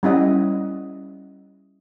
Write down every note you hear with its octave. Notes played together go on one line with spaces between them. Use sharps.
G3 C#4 E4 D#5 F#5